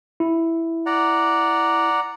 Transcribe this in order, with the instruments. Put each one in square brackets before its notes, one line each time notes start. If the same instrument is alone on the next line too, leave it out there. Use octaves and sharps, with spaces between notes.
[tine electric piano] E4
[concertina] D5 F#5 A#5